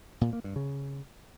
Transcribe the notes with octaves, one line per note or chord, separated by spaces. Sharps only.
A#2
A#3
G2
C#3